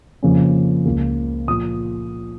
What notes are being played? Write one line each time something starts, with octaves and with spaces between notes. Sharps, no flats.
F2 C#3 F3 A#3 C#4
C#2 C#3 A#3
A#2 F3 A#3 D#6